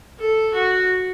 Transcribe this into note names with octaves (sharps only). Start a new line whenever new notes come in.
A4
F#4